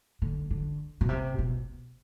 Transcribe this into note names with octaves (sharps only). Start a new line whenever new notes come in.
D3
D3
B2
C3
B2